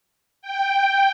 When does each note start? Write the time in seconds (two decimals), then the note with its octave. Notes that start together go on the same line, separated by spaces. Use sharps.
0.42 G5